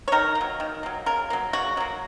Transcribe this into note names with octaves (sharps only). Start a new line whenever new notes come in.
C#5
D#3 A#4
A#3
F#3
D#3
F#3 A#3
C#3 A#4
F#3 A#3
C#3 F#4
F#3 A#3